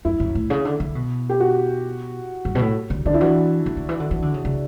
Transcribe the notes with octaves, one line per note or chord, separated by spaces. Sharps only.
F#2 E4
F#2
A2
C#3
D3
D3
B2
G4
F#4
G2
B2
A2
D3
D3 D4
E4
E3 F#4
D3
D3
E3
D3
E3
D3
C#3
C#3